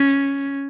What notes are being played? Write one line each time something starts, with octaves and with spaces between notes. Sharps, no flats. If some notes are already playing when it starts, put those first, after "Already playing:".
Already playing: C#4